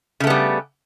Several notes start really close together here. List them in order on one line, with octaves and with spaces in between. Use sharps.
C#3 A3 B3 G3